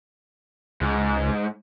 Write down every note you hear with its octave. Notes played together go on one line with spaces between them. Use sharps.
C#2 G#2